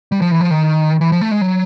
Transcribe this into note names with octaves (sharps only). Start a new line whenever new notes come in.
G3
F3
E3
F3
D#3
E3
F3
A3
G#3
F#3